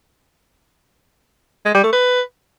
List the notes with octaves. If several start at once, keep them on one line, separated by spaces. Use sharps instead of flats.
G#3
G3
A3
B4